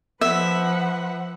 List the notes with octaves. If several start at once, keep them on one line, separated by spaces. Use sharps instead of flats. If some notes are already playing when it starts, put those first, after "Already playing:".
F3 B4 E5 F#5